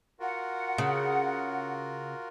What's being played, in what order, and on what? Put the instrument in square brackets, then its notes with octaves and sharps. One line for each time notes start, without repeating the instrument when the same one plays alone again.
[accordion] F4 F#4 A#4 [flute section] F#5
[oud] C#3